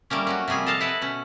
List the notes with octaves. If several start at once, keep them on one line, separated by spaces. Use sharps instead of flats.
G3 A3 A#3 C#4
F#3 C#4 F#4
C3 F3 G3 G#4 G#5
A4 D#5 F5 A5
E4 B4 D#5 F#5 A5
B2 C#4